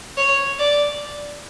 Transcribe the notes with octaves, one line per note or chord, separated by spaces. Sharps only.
C#5
D5